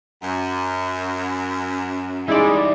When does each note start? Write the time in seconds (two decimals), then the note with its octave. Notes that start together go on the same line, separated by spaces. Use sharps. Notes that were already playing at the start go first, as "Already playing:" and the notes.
0.22 F#2
2.28 G3 G#3 D#4 E4 D5